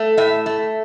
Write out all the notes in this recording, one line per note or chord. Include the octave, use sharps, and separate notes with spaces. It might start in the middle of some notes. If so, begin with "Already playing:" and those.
Already playing: A3
A2 E5
A3